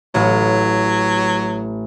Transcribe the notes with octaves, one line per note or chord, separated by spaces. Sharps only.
A1 F#3